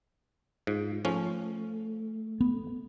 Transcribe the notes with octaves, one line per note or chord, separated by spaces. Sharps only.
G#2 G#3 F4
F3 A3 C#4
B3